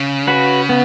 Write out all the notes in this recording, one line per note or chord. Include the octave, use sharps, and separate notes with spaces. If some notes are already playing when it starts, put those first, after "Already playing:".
Already playing: C#3
F#4 B4
B3